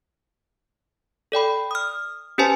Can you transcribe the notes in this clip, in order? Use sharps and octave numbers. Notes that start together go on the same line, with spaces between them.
A4 D5 G5 B5
D#6 F6
C#4 G4 B4 C5 G#5 A5